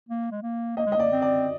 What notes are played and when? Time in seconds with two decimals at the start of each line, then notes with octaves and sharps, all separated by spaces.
0.09 A#3
0.31 G#3
0.42 A#3
0.77 A#3 D#5
0.86 G#3
0.92 D#5
0.96 A#3 D5
1.12 C4
1.22 D5